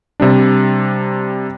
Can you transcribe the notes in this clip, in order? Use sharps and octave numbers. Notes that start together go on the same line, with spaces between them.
C3 G3 D4